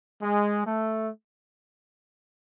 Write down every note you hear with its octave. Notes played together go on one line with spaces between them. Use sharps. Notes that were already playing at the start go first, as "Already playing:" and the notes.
G#3
A3